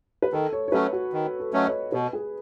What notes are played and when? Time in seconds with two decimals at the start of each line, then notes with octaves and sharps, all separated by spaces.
0.22 B4
0.33 D#3 A4
0.53 C#5
0.68 C#5
0.72 F#3 A3 C#4 B4
0.93 F#4
1.13 D#3
1.40 A4
1.53 F#3 A3 C#4 D#5
1.66 C#5
1.92 B2 B4
2.13 G#4